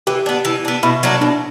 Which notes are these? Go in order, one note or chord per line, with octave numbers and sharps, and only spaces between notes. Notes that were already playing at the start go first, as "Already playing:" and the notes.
E3 G4
B3 D4
E3
B3 D4
B2 E4
F#3 A#3 D4
B2 D4